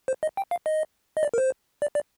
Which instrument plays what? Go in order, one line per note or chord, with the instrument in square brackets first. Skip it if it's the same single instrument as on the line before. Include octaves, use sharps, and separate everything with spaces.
[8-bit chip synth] C5
D#5
G5
F5
D#5
D#5
D5
A#4
C5
D5
D5